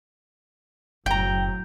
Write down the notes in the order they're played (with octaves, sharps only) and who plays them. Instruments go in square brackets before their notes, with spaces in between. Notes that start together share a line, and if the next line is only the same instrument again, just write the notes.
[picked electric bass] F#1 [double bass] A2 F#3 [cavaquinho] G5 A#5 [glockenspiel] G6